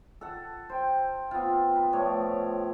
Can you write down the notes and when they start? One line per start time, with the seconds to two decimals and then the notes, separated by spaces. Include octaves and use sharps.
0.21 A4 F#5
0.69 C5 G5
1.31 B3 C4 F4
1.76 B4
1.93 A2 F3 C#5 D5